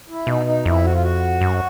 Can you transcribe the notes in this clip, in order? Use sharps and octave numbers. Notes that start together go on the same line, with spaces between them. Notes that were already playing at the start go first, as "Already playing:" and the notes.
E4
B2 D#4
D#4
F2 E4
F#4
F4
F#4
F#2